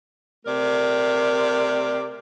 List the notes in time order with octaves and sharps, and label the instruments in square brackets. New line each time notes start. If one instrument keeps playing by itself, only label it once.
[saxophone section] C3 A3 A#4 D5